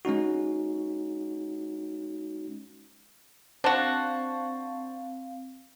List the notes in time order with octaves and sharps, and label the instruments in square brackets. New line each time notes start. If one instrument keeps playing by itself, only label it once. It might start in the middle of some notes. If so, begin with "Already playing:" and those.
[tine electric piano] G#3 C#4 D#4 F#4
[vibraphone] C4 F5 [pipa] D4 F#4 [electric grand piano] C5 A5